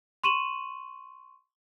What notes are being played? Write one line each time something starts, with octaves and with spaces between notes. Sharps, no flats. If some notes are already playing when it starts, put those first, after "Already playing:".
C6 C#6 D#7 E7 F#7